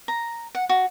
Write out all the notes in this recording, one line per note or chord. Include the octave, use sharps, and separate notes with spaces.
A#5
F#5
F#4